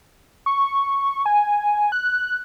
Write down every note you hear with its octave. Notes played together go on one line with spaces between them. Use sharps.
C#6
G#5
F#6